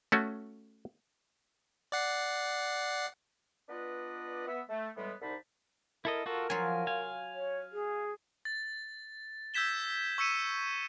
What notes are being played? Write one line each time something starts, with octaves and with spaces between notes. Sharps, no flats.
A3 C#4 F#4
D5 F#5 C7
B3 D4 F4 B4 D5 D#5
B3 E5
A3
A2 E3 G3 G#3 B3
C2 D3 D#4 C5 A5 B5
E4 A4 A#4 D#5
F4 F#4 A4 A#4
F3 F#3 F4 G#5
F5 G#5
C#5
G#4
A6
E6 G6 G#6 B6 E7 G7
C#6 E6 B6 C#7 D#7 E7